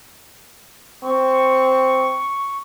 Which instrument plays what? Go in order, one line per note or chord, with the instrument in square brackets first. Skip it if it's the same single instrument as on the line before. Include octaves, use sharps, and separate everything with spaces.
[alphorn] C4 [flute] C#6